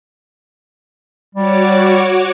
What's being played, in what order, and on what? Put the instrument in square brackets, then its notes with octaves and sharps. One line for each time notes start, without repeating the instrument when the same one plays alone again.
[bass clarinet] G3 [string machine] F#4 C#5 D6